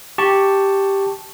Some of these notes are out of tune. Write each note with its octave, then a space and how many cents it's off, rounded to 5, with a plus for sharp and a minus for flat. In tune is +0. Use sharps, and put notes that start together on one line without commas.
G4 +0 A5 +0 C#6 +0